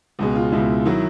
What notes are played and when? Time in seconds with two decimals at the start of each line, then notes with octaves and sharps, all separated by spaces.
0.19 C#2 B2 G#3
0.36 F4
0.52 C#2 B2 G#3 E4
0.85 D#3 F#3 E4